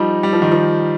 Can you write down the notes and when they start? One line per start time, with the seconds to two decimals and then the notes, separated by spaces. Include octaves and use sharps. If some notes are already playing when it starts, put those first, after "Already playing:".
Already playing: F3 G3 D#4
0.23 G3
0.33 F3
0.42 D#3
0.52 F3